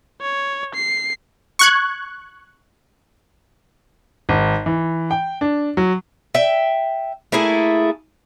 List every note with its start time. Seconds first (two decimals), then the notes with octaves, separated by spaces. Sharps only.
0.21 C#5
0.75 C7
1.59 C#6 F#6 G#6
4.29 G#1
4.66 E3
5.11 G5
5.41 D4
5.77 F#3
6.34 E5 G5
7.32 A3 A#3 E4 G#4